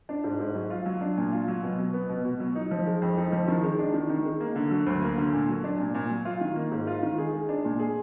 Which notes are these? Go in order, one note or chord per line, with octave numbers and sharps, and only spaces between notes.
D4
G#2
G#2
F#3
F4
F#3
D4
A#2
F4
F#3
B2
F#3
B3
B2
B2
F#3
D#4
F3
G#3
F2
D#4
F3
D#3
G#3
D4
D#3
D#3
G#3
A#3
D3
F#3
D2
A#3
D3
A#2
F#3
D4
A#2
A#2
F#3
F4
D#3
A#3
G#2
F4
D#3
G#4
G#3
D4
A#2
G#4